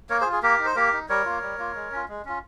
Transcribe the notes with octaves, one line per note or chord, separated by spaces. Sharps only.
A#3 A#4 C#5
G#4 C5
F4
G#4
A#3 G4 A#4
D#4
C5
A#3 G4 A#4
D#4
G3 A#4 C#5
A#3 F4
G3
A#3 F4
G#3
C#4 F4
G#3
C#4 F4